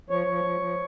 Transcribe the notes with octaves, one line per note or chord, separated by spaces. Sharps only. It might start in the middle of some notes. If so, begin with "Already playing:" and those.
F3 C#5
F3
F3
F3